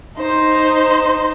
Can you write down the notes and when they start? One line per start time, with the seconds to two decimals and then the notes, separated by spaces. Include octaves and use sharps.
0.18 D#4 C5